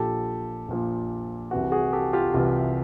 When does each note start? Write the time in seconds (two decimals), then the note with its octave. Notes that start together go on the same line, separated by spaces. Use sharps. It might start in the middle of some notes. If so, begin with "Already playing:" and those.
Already playing: A#1 A#2 F3 G4 A4
0.68 A#1 A#2 F3
1.51 C2 C3 E3 F#4
1.72 F#4 G#4
1.93 G4 A4
2.13 F4 G4
2.34 C2 C3 E3 F4